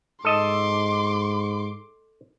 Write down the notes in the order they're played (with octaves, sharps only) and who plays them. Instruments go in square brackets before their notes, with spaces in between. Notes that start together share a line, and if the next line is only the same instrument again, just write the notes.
[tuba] G#2 [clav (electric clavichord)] A4 D#5 A5 [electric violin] C6 D6